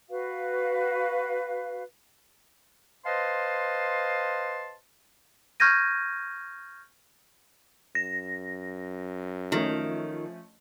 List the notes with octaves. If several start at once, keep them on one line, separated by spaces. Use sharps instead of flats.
F#4 B4 F5
B4 C5 D#5 F5 A5 C6
C#6 F6 G6 G#6 A#6 D#7
F#2 A#6
D#3 F3 A3 C#4